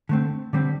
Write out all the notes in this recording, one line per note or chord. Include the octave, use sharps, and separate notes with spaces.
D3 A3 C4
D3 G3 C4